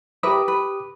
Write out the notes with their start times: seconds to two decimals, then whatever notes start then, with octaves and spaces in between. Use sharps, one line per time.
0.23 G4 A#4 B4 E5 D6 D#6
0.48 B4